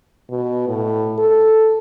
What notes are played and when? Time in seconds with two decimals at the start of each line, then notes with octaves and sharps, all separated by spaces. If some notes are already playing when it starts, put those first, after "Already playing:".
0.30 B2
0.68 A2
1.18 A4